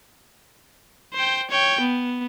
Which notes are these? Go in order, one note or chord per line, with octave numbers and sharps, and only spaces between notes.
C5 G5
C#5 G5
B3